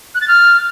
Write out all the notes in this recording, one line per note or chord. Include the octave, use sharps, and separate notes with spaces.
F#6
A6
F6